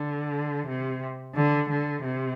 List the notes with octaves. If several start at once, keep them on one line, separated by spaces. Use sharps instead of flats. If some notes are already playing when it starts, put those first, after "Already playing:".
Already playing: D3
C3
D3
D3
C3